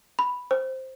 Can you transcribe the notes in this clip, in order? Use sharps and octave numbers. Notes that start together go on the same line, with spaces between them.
B5
C5